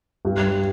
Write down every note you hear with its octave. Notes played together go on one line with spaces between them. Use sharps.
G2